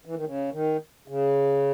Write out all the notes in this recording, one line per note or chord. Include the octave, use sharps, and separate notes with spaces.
E3
D#3
C#3
D#3
C#3